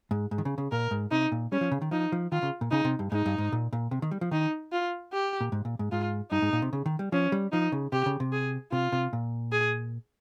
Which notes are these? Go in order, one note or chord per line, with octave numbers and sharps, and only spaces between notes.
G#2
G#2
D#3
C#3
C#3
A#2 A#4
G#2
C3 D#4
A#2
G3 C#4
F3
C#3
D#3
F3 D#4
F3
D#3 F4
C#3
A#2
C#3 D#4
C3
G2
G#2 D#4
G2
G#2
A#2
A#2
C3
D#3
G3
F3
D#3 D#4
F4
G4
A#2
G#2
A#2
G#2
G#2 F4
G2 D#4
G#2
A#2
C3
C#3
D#3
G3
F3 C#4
G3
F3 D#4
C#3
C3 G4
C#3
C3
G#4
C3 F4
C3
A#2
G#4